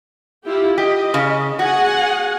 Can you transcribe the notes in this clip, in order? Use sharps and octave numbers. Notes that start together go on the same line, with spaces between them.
E4 F4 G4
G4 D#5
C#3
F#4 G#4 F#5 G#5